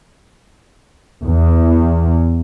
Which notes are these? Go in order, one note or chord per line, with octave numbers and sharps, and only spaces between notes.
E2